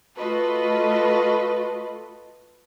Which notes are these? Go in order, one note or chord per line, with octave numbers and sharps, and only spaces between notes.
A3 F4 F#4 A4 B4 D#5